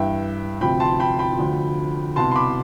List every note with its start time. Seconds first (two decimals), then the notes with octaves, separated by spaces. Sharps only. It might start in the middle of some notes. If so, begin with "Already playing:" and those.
Already playing: G2 E3 E5 G5
0.61 D2 C3 F3 G5 B5
0.80 A5 C6
1.00 G5 B5
1.19 G5 B5
1.38 D2 D3 F3
2.16 C2 B2 A5 C6
2.31 C6
2.35 B5 D6